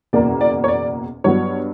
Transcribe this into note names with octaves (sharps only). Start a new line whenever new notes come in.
F#1 E2 B2 A#3 D5
D5
C#5
D5
G2 F#3 B3 C#5